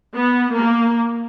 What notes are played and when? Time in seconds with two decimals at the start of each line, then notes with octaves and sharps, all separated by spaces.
0.15 B3
0.54 A#3